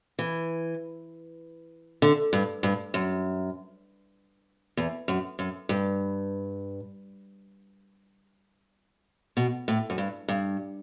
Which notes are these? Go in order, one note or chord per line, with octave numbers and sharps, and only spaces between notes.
E3
D3
G2
G2
F#2
E2
F#2
F#2
G2
B2
A2
F#2
G2
G2